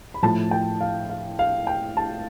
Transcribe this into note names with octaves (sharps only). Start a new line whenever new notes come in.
B5
A2 F3 A3 A5
G5
F5
F5
F5
G5
A5